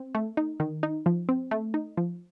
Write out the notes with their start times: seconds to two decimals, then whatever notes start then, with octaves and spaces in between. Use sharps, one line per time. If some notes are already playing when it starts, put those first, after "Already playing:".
Already playing: C4
0.15 A3
0.37 D#4
0.60 D#3
0.83 D#4
1.06 F3
1.29 C4
1.51 A3
1.74 D#4
1.97 F3